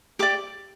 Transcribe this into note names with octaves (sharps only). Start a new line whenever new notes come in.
G4 D5 D6